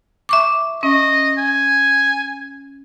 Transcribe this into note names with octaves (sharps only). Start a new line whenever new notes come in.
E5 C#6 D6
C#4 D#5
G#5